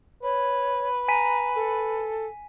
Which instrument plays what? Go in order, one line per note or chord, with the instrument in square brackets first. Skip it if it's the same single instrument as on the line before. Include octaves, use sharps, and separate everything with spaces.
[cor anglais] B4 [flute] C#5
[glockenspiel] G#5 B6 D#7 [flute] A#5
[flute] A4